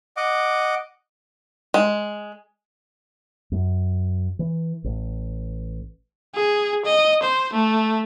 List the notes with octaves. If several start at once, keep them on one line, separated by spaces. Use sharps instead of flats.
D#5 F#5 D6
G#3
F#2
E3
A1
G#4
D#5
C5
A3